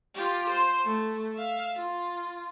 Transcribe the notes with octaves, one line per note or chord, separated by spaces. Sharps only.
F4 G4
C5
A3
E5 F5
F4